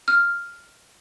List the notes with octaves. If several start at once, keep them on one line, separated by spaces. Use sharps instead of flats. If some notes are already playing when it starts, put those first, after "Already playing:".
F6